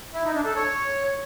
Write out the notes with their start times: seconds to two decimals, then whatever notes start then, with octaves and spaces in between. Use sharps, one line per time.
0.14 E4
0.24 D#4
0.35 D4
0.45 A4
0.56 C#5